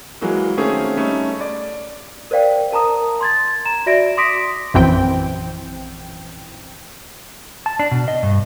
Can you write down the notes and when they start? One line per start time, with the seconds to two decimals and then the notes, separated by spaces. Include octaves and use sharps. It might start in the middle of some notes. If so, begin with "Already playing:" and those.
0.21 E3 F#3 G#3 A#3 F#4
0.57 D#3 A3 A#3 C4 C#4 G#4
0.96 G3 A3 C#4 D#4
1.41 D5
2.31 A#4 C5 D5 F5 G5
2.72 A#4 A5 A#5 D#6
3.21 C6 G#6 A6
3.65 A#5 E7
3.86 F#4 D5 E5 A#6 D7
4.17 C6 D6 D#6 A#6 B6 D7
4.74 A#1 F#2 E3 C4 G5
7.66 A5
7.79 D4
7.91 B2
8.08 D#5
8.23 G2